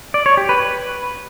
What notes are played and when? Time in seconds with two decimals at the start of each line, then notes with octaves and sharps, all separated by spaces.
0.14 D5
0.26 C#5
0.37 G4
0.49 B4